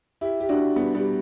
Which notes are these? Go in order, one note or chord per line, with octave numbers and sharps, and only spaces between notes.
E4 G4
G4
D4 F#4
G3 B3
G3 B3